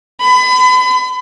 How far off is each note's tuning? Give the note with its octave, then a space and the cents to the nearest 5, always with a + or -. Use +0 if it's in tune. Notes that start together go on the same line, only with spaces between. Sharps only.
B5 +35